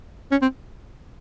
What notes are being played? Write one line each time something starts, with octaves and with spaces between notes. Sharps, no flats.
C#4
C4